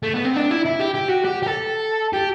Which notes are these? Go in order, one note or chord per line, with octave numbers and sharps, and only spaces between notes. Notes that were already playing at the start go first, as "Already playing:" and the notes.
A3
B3
C4
D4
E4
E4
G4
G4
F#4
G4
G4
A4
G4